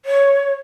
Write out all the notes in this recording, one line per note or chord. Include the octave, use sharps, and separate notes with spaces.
C#5